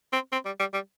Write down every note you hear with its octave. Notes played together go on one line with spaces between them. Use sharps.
C4
C4
G3
G3
G3